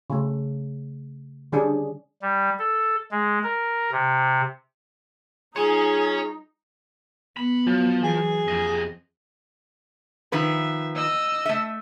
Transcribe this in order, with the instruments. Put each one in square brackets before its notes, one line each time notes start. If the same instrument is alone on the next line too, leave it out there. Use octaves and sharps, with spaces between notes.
[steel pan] C#3 A3
D3 G3 C#4 D4 G4 G#4
[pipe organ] G3
A4
G#3
A#4
C3
[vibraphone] G3 F4 [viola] D#4 [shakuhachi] G#4 [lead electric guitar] C#5 G#5
[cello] B3 [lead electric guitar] B5
[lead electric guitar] F3 [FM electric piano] F#3
[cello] E3 [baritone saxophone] G#4
[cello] F2 [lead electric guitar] C3 D#5
[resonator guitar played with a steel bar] D#3 F3 B4 [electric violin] E5
[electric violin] D#5 E6
[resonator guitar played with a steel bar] A3 E5